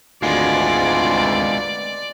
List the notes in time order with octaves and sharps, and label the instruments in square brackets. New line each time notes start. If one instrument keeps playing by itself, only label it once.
[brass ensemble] G#1 D2 [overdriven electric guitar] G#3 B3 [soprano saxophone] F4 [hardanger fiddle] D5